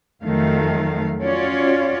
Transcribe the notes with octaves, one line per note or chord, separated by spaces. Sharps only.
F2 D#3 F#3 A3 F5
C#4 F4 F#4 C#5 D5